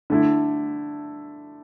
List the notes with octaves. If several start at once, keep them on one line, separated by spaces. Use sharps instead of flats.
D3 A3 E4